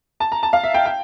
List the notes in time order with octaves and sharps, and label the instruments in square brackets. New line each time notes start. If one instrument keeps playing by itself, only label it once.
[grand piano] A5
A#5
A5
F5
E5
G5
G5